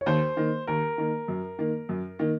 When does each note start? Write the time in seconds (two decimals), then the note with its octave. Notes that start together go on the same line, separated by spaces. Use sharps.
0.01 C#5
0.06 D#2 C5
0.37 D#3 A#3
0.67 D#2 A#4
0.98 D#3 A#3
1.28 F#2
1.59 D#3 A#3
1.89 F#2
2.19 D#3 A#3